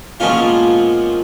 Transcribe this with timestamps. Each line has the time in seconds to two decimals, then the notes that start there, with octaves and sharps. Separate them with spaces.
0.20 A#2 F3 G#3 B3 C#4 F4